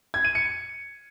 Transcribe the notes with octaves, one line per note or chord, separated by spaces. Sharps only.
G#6
D#7
C#7